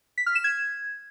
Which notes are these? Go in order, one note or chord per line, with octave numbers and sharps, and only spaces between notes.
B6
F6
E7
G#6